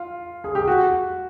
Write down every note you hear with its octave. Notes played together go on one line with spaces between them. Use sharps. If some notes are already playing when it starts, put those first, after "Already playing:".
Already playing: F4
G#4
G4
F#4